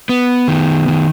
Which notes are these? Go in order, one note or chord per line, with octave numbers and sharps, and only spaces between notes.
B3
D#3
D#3